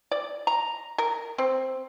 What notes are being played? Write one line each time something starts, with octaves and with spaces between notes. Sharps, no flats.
D5
A#5
A#4
C4